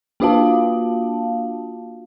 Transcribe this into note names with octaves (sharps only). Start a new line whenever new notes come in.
A#3 D4 F4 F#4 F5 A5